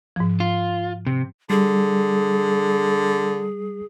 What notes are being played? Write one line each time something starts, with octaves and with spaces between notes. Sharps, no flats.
G#2 F3
F4
C3
D3 G3 G#4